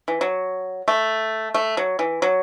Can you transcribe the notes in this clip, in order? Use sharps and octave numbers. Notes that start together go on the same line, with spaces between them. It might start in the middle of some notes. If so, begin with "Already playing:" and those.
E3
F#3
A3
A3
F#3
E3
F#3